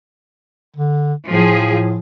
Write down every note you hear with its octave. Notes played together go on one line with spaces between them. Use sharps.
D3
A2 F3 G#4